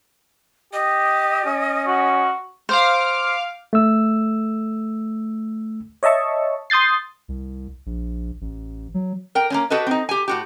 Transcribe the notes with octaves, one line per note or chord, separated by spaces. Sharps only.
G4 D#5
C#4
F#4
C5 F5 D6 F6
A3 E6
C#5 D#5 E5 A5 C#6
C6 D#6 G6 A6 C7
C2
A#1
A1
F#3
A#4 G5
A#3 C4 C#4
F#4 G4 A4 B4 D#5
C4 D#4
G4 G#5
A2 F#4 G4